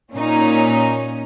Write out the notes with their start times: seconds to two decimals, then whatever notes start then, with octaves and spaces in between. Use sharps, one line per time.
0.15 A#2 C#4 D#4